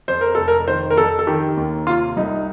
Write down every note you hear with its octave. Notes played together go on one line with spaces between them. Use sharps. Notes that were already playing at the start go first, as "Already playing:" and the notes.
F2 C5
A#4
F1 A4
A#4
D#3 C5
A#4
F2 A4
A4
D#3 G4
D#2
C3 F4
C2 D#4